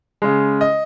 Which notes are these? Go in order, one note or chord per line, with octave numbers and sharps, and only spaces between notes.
C#3 G#3
D#5